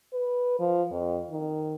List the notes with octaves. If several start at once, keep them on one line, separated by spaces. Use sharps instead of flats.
B4
F3
F2
D#3